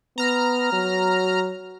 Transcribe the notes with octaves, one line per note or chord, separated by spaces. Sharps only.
B3 A#5 F6
F#3